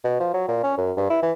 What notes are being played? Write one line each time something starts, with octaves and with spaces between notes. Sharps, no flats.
B2
F3
F#3
A#2
C#4
F#2
G2
E4
E3